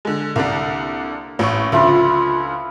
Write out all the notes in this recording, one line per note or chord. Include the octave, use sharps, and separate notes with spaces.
D3 G#3
C2 D3 A#3 D4
A1 C#6
C#2 D3 F3 E4 F4 B5